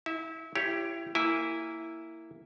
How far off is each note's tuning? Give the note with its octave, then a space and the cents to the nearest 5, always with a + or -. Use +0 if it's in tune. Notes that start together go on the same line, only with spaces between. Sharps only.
E4 -30 E5 +0
E4 +25 G4 +0 C#5 +0
A#3 -15 E4 +0 G#5 -20